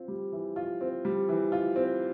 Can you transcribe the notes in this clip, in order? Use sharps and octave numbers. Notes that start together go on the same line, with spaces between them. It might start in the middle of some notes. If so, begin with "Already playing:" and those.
Already playing: C4 F4
G3
E3
F4
C4
G3
E3
F4
C4